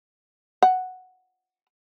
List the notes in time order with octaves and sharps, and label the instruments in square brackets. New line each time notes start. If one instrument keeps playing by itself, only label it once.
[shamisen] F#5